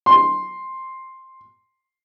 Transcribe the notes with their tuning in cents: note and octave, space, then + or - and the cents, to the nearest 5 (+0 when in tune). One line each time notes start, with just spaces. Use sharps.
C6 +5